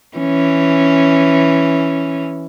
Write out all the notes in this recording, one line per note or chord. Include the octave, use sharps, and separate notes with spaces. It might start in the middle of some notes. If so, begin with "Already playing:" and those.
E3 C#4